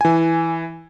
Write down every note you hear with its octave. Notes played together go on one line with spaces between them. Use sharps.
E3 G#5